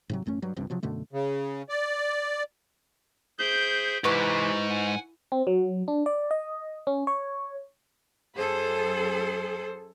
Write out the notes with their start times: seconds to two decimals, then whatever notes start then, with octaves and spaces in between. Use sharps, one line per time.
0.10 G#2 C3 F#3
0.26 A1 F#2 A3 C#4
0.42 G2 F#3
0.56 G1 C#2 G2 C3
0.70 C3 F3 F#3
0.83 F#2 B2 D3 A3
1.13 C#3
1.69 D5
3.39 G#4 C5 E5 G6 D7
4.04 G#2 C3 E3 E4 B4 C#6 D6
4.69 F#5 G#5
5.32 C4
5.47 F#3
5.88 D4
6.06 D5
6.31 D#5
6.87 C#4
7.07 C#5
8.36 F#2 G#4 A4 C5